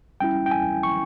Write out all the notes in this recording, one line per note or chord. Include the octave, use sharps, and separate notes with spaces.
G3 C#4 E4 G5
G5
G#5
C#6